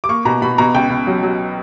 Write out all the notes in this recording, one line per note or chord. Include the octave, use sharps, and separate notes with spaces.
D6
A#3 C#6
B2 A#5
B2 B5
B2 A#5
C#2 G5
C#2
F#3
F#3